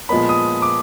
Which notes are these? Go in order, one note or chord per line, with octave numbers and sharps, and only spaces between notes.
A#2 F3 G#3 B3 B5
D#6
D6